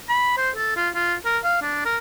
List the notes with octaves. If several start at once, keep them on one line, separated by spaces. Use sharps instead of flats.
B5
C5
A4
F4
F4
A#4
F5
D4
A#4